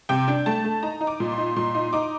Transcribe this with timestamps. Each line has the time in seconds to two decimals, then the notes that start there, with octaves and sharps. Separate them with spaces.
0.09 C3 G5
0.28 D4
0.46 A3 A5
0.65 A3
0.83 D#4 A#5
1.01 D#4
1.07 D6
1.20 A#2
1.32 C6
1.38 D#4
1.56 A#2 C6
1.75 D#4
1.93 D#4 D6